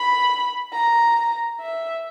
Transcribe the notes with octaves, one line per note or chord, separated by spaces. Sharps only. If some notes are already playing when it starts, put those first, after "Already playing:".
Already playing: B5
A#5
E5